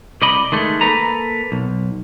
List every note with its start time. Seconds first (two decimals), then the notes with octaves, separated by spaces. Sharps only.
0.22 C2 D5 D#5 B5
0.52 D#3 G#3 A3
0.81 A#3 A4 B4 A#5
1.52 B1